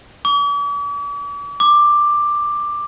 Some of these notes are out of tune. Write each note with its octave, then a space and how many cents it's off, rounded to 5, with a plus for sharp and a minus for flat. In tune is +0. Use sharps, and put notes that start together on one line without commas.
D6 -45
D6 +10